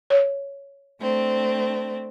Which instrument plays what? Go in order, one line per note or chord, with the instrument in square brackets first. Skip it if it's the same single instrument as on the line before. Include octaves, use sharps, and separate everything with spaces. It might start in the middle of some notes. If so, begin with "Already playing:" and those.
[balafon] C#5
[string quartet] A3 C4 D4